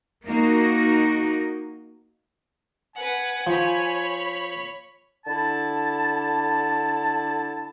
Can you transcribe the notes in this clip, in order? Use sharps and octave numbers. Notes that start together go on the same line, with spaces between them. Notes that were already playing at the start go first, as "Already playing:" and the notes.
A#3 D#4 F#4
B4 F#5 G#5
F3 C#5 B5
D3 E4 A5